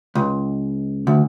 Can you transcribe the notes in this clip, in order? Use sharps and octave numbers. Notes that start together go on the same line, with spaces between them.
C#2
D2